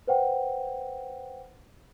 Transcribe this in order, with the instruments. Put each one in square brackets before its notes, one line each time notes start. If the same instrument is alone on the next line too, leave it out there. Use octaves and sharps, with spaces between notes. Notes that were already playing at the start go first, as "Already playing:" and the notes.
[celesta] B4 C5 F#5 G5